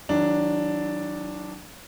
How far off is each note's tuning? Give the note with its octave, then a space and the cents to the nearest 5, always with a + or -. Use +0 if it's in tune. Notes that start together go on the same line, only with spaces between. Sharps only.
D#3 +45 F#3 +10 D4 +0